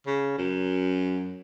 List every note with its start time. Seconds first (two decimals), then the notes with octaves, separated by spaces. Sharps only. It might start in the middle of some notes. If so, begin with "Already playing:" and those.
0.07 C#3
0.38 F#2